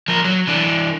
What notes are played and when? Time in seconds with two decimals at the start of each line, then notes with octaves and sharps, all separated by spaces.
0.08 F3 A#4
0.25 F#3
0.47 E3 D4